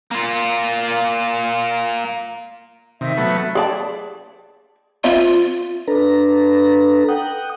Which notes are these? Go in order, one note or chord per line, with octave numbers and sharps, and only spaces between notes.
A#3 F4
C3 D#3 E5
F#3 A3 B3
G#4 D5 A5
F3 C4 F4 E5
D4 A4 B4 A#5
F#5 G5 D#6